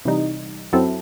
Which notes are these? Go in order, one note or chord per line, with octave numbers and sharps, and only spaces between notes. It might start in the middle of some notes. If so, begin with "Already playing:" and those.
C3 E3 G3 D#4
F#2 F#3 C4 E4 A4